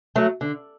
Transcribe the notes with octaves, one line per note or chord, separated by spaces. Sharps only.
F#3 A3
D3